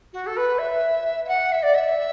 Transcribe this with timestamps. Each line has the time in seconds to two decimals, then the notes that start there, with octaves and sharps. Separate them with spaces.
0.13 F#4
0.26 A4
0.37 B4
0.58 E5
1.24 E5
1.28 F#5
1.52 E5
1.63 D5
1.74 E5